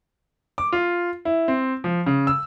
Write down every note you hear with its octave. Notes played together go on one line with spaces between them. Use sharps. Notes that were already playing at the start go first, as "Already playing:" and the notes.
D6
F4
E4
C4
F3
C#3
E6